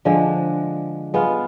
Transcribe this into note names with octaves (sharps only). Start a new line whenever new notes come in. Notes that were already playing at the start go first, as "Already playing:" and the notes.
D3 F3 G#3 D4
G#3 B3 F4